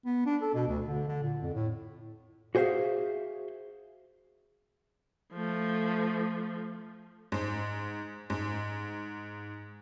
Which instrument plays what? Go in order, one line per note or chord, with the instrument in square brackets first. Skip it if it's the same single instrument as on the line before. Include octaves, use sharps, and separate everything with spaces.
[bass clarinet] B3
D4
A4
B2
D2
D3
D3
A#2
F2
A2
[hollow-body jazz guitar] F#4 G#4 C5 E5 F5
[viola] F3 A3
[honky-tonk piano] G#2 C5
G#2